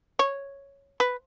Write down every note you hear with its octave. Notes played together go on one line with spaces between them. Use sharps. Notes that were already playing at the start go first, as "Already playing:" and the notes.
C#5
B4